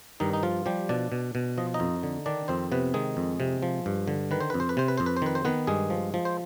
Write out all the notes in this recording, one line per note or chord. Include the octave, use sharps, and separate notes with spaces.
G2 D#3 D#4
D#4
F3 F4
F3 G3 G4
B2 D4 D5
B2
B2
F3 D#5
D#4 D#5
F2
D3
D#3 D4 D5
F2 C4 C5
C3 B3 B4
D#3 G#3 G#4
F2
C3
F3
G2
D3
D#3 B4
C5
F2 B4
C5
B4
C3 C5
B4
F2 C5
B4
C5
D#3 B4
C5
D#3 B3 B4
G2 G#3 G#4
F3
F3
C5